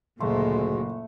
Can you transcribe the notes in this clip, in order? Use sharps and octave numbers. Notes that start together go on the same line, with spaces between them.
F#1 D2 A#2 G#3 A3 C6